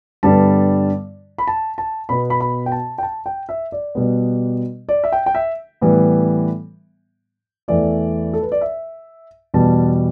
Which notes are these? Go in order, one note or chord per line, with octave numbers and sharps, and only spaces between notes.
G2 D3 G3 B3 A5
B5
A5
A5
B2 B3 B5
B5
B5
G5
A5
G5
A5
G5
E5
D5
B2 G3 B3
D5
E5
G5
G5
E5
A2 E3 G3 B3
E2 E3 A3 D5
A4
B4
D5
E5
E2 B2 G3 B3 A5